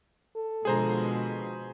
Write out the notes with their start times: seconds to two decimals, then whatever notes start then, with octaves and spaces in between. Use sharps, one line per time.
0.36 A4
0.65 B2 D3 F3 G#3 G#4 C5 A#5